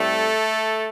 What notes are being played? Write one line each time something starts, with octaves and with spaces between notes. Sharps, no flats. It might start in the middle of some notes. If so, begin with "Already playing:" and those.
Already playing: A2 G3 A3 C4 A4